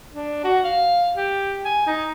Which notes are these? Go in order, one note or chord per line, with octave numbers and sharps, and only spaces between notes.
D4
F#4
F5
G4
G#5
D#4